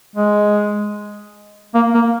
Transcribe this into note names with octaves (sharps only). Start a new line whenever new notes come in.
G#3
A#3
A#3